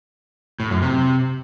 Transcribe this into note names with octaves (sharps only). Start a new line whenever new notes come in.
A2
F#2
C3